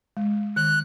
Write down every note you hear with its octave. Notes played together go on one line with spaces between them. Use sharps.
G#3
D#3 F#6